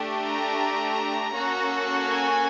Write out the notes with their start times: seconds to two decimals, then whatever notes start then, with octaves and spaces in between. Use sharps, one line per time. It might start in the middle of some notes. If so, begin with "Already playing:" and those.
Already playing: A3 D4 G4
0.23 A#5
1.34 A#3 C#4 F#4 A4
2.09 G#5